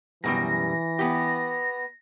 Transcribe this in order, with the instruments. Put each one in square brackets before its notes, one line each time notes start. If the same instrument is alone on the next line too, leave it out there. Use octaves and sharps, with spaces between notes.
[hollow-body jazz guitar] F#2 B2 G3 [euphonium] E3 [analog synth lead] A#6
[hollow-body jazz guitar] B3 G4